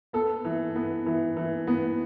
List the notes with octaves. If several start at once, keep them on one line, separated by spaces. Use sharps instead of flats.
B3 A4
E3
B3
E3
E3
B3